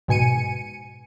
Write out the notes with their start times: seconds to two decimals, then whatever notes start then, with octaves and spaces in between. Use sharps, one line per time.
0.08 G#2 B2 G#5 C#7 D#7